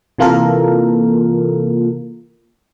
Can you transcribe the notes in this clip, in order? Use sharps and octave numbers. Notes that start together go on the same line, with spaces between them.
C3 E3 A#3 F4 A4 A#4